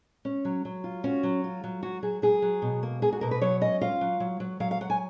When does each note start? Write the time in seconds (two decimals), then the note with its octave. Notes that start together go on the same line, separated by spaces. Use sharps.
0.25 C#4
0.45 F#3
0.65 F#3
0.84 F4
1.04 C#4 F#4
1.23 F#3
1.44 F4
1.64 F#3
1.83 F#3 F#4
2.02 F#3 G#4
2.22 F#3 G#4
2.42 F#3
2.62 B2
2.83 A#3
3.02 A#3 G#4
3.12 F#4
3.21 B2 A#4
3.31 B4
3.41 F#3 C#5
3.61 C#4 D#5
3.81 F4 F5
4.01 F#3
4.20 F#3
4.40 F#3
4.60 F#3 F5
4.71 F5
4.81 F#3 F#5
4.90 G#5